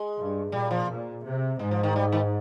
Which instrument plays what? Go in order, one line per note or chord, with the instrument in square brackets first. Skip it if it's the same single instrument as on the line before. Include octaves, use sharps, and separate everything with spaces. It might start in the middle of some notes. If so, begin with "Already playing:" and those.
Already playing: [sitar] G#3
[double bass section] G2
[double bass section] A#2 [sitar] G3
[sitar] F3
[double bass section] A#2
C3
[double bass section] G#2 [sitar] G#3
[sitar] F3
D#3
G3
D#3